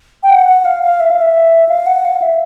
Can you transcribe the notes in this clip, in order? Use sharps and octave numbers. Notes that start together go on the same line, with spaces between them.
G5
F#5
F#5
F5
F5
E5
F5
E5
F5
F#5
F5
E5